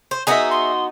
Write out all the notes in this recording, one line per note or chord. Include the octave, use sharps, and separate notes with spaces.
C5
B3 D#4 F#4 G#4 D#5 E5
C6